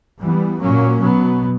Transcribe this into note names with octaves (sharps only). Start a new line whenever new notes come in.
E3 G3 B3
A#2 F#3 A#3 C#4
B2 F#3 B3